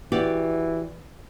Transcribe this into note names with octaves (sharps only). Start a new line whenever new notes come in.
E3 F#4 G4 D5